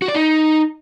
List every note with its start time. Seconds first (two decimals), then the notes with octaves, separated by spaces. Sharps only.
0.02 F#4
0.08 D5
0.15 D#4